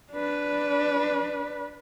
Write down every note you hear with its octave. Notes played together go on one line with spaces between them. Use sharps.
D4 B4